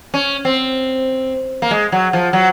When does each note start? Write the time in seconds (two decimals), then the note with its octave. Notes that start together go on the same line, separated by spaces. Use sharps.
0.14 C#4
0.45 C4
1.62 A#3
1.71 G#3
1.92 F#3
2.13 F3
2.33 F#3